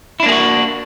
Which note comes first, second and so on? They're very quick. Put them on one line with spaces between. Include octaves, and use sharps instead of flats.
E4 D4 A#3 G#4 F#4